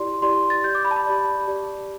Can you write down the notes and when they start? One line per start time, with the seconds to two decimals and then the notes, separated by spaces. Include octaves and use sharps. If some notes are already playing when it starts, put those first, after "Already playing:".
Already playing: E4 G4 D5 C6
0.22 E4 G4 D5 C6
0.50 A6
0.64 G4 D5 G6
0.75 D6
0.85 B5
0.91 A5
0.96 B5
1.06 G4 D5
1.48 G4 D5